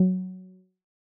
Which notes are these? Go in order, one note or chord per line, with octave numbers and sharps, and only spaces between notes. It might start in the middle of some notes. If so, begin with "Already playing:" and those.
Already playing: F#3